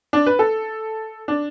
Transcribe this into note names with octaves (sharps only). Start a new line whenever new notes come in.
D4
B4
A4
D4